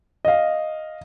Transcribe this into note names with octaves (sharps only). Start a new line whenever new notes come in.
D#5 F5